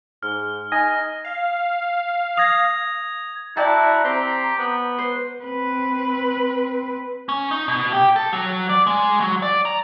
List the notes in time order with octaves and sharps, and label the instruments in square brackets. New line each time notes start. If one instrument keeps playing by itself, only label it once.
[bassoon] G#2 [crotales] F6
[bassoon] D#4 [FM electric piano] G#5 D#6 [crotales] A#6
[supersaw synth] F5
[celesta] D#6 A#6 [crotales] G#6 F7
[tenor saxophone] E4 [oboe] F#4 [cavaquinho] D5 G5 A5 [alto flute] A#5
[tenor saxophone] C4 [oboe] G4
[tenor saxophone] B3
[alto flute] B4 [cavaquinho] C5 [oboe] C6
[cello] C4 B4
[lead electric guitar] C#4
D#4
B2
G4
A4
F#3
D5
G#3
F#3
D5
A#5